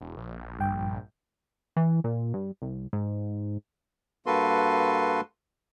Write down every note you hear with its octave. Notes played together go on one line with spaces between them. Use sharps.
E1
A#1
G1 G2 G5
E3
A#2
G2
C2
G#2
G2 A#3 F#4 A4 B4 C6